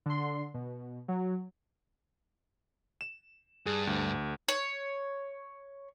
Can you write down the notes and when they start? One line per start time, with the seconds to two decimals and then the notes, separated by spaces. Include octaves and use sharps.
0.06 D3 C6
0.54 B2
1.08 F#3
3.01 E7
3.66 G2 G#4
3.87 D2
4.48 C#5